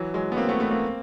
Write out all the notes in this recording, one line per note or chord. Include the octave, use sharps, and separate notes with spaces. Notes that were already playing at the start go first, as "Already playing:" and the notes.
Already playing: E3 F#3
F#3 G#3
B3
A#3 C4
A3 B3
A3 B3
A#3 C4